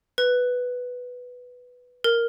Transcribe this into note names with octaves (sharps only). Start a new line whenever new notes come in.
B4
A#4